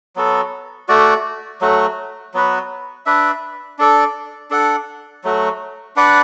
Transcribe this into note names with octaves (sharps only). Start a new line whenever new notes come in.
F#3 B3 F#4 A4
A3 F#4 D5
F#3 A3 F#4
F#3 B3 F#4 B4
D4 B4 E5
D4 A4 D5
D4 A4 F#5
F#3 A3 F#4
D4 B4 D5 F#5